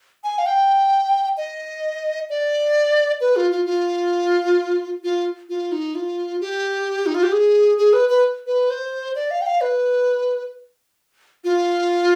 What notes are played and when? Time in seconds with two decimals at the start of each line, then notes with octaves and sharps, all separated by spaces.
0.24 G#5
0.38 F5
0.46 G5
1.37 D#5
2.30 D5
3.21 B4
3.36 F4
3.51 F4
3.66 F4
5.04 F4
5.49 F4
5.72 D#4
5.95 F4
6.41 G4
7.06 D#4
7.14 F4
7.23 G4
7.32 G#4
7.78 G#4
7.93 B4
8.09 B4
8.47 B4
8.70 C5
9.15 D5
9.31 F5
9.41 G5
9.46 F5
9.61 B4
11.44 F4